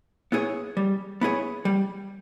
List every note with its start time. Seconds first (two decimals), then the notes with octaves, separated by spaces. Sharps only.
0.32 B3 E4 G#4 C#5
0.77 G3
1.21 B3 E4 G#4 C#5
1.65 G3